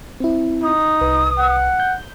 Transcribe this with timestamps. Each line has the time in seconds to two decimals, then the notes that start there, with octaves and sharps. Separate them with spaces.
0.20 C4 E4
0.63 D#4 D#6
1.01 C2 B4
1.38 F#5
1.80 G6